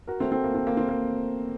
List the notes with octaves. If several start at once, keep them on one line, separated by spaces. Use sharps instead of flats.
F#4 A#4
A3 C4
A3 C4
A#3
C4
A#3
C4
A#3